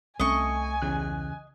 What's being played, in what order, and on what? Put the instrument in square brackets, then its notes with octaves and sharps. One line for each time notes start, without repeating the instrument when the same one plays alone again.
[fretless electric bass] C2 C4 C#4 [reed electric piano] A3 [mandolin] D#5 C#6 [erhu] G#5
[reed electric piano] E2 C#3 F#6